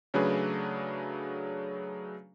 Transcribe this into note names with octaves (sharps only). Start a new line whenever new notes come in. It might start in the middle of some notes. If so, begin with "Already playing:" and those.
C#3 F#3 A3 D4 G#4 B4